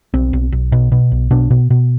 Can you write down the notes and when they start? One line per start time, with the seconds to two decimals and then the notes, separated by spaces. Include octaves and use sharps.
0.14 B1 C4
0.33 B1
0.52 B1
0.72 B2
0.92 B2
1.12 B1
1.31 B2 D4
1.51 B2
1.70 B2